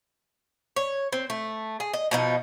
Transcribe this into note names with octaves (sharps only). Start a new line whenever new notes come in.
C#5
C4
A3
G#4
D#5
B2 F3 D#4